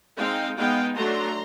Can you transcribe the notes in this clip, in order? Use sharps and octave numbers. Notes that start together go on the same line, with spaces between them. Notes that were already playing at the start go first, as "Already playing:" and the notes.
G#3 C4 D#4 F5 G5
G#3 B3 D#4 F5 G5
F#3 A3 D4 A#5 C6